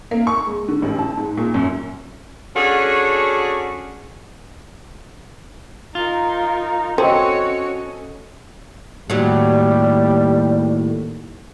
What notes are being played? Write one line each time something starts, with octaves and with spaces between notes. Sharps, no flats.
A#3
C#6
G#3
D3
A1
A5
G#2
A#2
F#2
C#4 D4 F#4 G#4 A4 C#5
D#4 F4 A#4
C4 C#4 F#4 A4 C#5 D#5
D#2 A2 F#3 G3